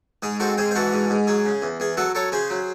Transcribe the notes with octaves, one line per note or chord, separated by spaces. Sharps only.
G#2 G#4
C4 F#4 A4
G#2 G#4 C5
C5
E3 F#4 A4
G#2
G#2
F#3 G#4
C#3
E2
E2 G#4
F#3 F#4 A4
F#3 A4 C#5
C#3 G#4 C5
F#3